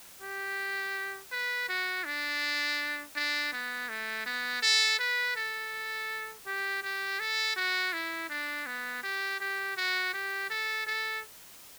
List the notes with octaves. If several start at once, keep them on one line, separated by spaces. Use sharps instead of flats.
G4
B4
F#4
D4
D4
B3
A3
B3
A4
B4
A4
G4
G4
A4
F#4
E4
D4
B3
G4
G4
F#4
G4
A4
A4